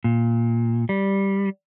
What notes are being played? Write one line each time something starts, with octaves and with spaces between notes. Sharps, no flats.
A#2
G3